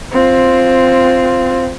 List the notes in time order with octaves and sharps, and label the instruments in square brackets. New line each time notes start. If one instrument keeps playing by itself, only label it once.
[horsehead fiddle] C4 F4